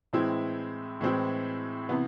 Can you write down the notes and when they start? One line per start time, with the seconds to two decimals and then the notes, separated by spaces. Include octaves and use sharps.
0.13 A2 E3 G#3 C4 E4
1.01 A2 E3 G#3 C4 E4
1.89 C3 E3 B3